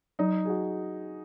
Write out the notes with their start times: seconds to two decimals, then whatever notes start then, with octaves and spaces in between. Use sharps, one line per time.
0.19 F#3 D#4
0.45 G#4
0.49 F#4